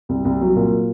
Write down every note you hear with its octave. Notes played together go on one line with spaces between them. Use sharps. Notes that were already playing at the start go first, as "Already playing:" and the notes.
C2
C2
F#3
A#2